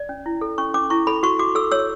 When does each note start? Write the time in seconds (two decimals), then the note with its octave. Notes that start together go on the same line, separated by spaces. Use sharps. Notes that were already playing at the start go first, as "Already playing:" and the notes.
Already playing: D5
0.09 C#4
0.26 E4
0.41 A4
0.58 C#4 C#6
0.74 C#4 D6
0.90 E4 C#6
1.07 A4 B5
1.23 F#4 C#6
1.39 F#4 D6
1.55 A4 E6
1.71 C#5 E6